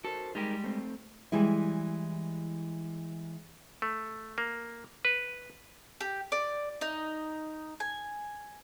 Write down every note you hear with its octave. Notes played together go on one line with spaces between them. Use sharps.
F#4 A4 A#4 C5
G3 G#3 D#4 G4 G#4 A#4
A3 C4
E3 G3 G#3 E4
A3
A#3
B4
G4
D5
D#4
G#5